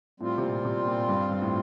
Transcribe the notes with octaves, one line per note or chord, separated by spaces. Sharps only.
A2 G3 C4 F4
C3
A#2
C3
A#2
G2
G2
A2